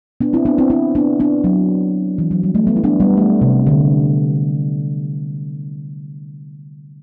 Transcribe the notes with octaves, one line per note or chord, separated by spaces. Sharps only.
B3 D4
C4 E4
B3 D4
C4 E4
C4 E4
B3 D4
B3 D4
F#3
E3
F#3
G3
A3
G3 B3
E4
B3 D4
G3 B3
A3
C3
D3